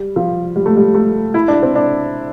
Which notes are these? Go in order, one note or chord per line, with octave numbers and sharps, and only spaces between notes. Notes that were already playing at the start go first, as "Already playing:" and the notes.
Already playing: G3
F3
G3
A3
G3
A3
E4
D4
C4
D4